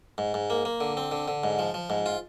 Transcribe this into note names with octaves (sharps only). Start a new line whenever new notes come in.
G#2
G#2
A#3
A#3
D3
C4
D3
D3
G#2
F3
F3
G#2
F4